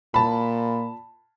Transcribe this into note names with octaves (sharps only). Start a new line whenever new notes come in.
A#2 A5 B5